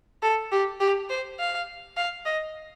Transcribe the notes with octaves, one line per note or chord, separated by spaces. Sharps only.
A4
G4
G4
C5
F5
F5
D#5